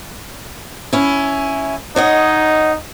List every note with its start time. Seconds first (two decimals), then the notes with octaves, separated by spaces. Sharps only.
0.93 C#4 E4
1.96 D#4 C#5 D#5 F#5